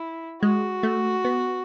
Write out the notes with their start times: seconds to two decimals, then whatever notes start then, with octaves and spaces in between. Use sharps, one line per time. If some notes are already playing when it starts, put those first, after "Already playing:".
Already playing: E4
0.42 G#3 F#4
0.83 A3
1.25 B3